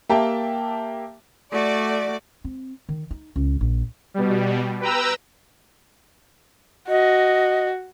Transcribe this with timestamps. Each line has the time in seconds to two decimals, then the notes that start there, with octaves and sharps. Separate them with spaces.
0.09 A#3 G4 E5 G5 A5
1.52 A3 F#4 D5
2.44 C4
2.89 D#3
3.11 D#4
3.36 C#2
3.61 A#1
4.14 B2 G3
4.81 B4 G5 A#5 E6
6.89 F#4 D#5